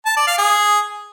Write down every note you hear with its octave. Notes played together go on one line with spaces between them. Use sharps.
A5
D5
F5
G#4